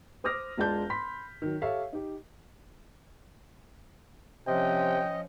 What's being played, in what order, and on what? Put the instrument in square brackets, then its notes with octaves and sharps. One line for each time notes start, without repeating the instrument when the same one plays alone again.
[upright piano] C5 D6 D#6 F6 A#6
E1 G#3 F4 D5 A5 G6
B5 C6 B6
D#3 F#3
G4 A4 C#5 E5 F5
D#4 G4
[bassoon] C3 [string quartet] F3 C#4 [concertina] D#5 [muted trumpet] G5